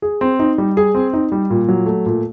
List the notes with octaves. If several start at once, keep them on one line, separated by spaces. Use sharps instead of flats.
G#4
C4
D#4
G3
G#4
C4
D#4
G3
A#2
F#3
A3
A#2